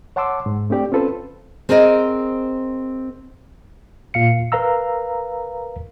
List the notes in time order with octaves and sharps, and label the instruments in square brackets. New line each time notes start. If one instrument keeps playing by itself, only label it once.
[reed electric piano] C#5 F#5 A5 C6 D6 E6
G#2
A3 C4 D4 G4 D5 G5
C4 C#4 F4 A4 B4 C5
[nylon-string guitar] C4 G#4 A#4 C5 D#5
[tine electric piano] A#2 F5 C#7
A#4 B4 F5 A#5 E6